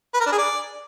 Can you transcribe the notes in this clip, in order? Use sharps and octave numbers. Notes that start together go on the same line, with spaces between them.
B4
A#4
D4
G#4
D5